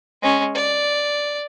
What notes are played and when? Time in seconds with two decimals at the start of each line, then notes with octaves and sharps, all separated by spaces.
0.22 G#3 C#4
0.55 D5